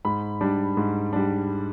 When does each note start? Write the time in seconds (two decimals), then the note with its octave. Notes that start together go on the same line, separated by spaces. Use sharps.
0.05 G#2 B5
0.41 G3 D4
0.77 G#2
1.13 G3 D4